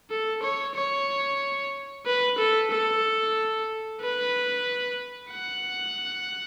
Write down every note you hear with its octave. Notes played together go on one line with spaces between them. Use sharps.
A4
C#5
C#5
B4
A4
A4
B4
F#5